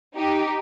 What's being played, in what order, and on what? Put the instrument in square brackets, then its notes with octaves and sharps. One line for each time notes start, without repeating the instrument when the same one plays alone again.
[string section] D#4 G4